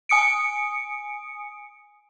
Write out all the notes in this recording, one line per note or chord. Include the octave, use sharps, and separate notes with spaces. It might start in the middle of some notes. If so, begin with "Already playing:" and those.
G#5 D#6 C#7 D7